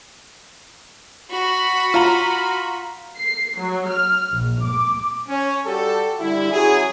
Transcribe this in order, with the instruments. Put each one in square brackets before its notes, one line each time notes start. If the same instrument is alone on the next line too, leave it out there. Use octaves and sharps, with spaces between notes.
[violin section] F#4 B5
[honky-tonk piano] F4 A#5
[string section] C7
F#3
F6
A#1
D6
[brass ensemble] C#4
G3 F#4 G4 A4
D3 G3 E4
F#3 C#4 E4 F#4 G#4